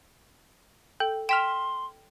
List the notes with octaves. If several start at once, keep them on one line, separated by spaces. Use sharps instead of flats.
A4 G5
G5 C6 F6 B6 E7